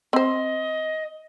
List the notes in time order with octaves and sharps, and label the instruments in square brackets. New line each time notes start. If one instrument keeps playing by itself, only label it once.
[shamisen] C4 C5 [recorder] D#5